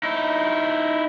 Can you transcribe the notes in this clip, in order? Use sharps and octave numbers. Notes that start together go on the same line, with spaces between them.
D#4 E4